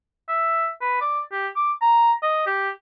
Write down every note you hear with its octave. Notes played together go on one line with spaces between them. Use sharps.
E5
B4
D5
G4
D6
A#5
D#5
G4